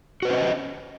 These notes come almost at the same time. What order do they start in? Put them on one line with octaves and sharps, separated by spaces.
F#4 B4 C5 C#4 D#5